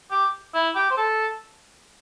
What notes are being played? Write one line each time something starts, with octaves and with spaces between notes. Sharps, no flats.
G4
E4
G4
C5
A4